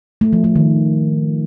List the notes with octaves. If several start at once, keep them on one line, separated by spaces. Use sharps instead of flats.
A3
F3
A3
D#3